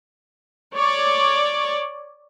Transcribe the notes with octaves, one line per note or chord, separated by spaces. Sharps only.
C#5 D5